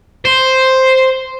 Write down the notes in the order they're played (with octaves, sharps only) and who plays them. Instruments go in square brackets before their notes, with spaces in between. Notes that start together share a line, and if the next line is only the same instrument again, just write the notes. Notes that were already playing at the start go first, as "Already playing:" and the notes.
[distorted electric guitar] C5